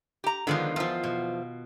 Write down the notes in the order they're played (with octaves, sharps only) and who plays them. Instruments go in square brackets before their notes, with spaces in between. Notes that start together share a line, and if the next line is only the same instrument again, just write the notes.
[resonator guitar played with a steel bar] G4 A#5
[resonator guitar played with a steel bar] D3 F3 G#3 [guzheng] D#3 B3 F4
[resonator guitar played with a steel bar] E2 F3 [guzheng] F4
[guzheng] B2